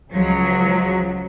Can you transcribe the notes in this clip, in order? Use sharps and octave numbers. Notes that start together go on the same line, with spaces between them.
C#2 F3 F#3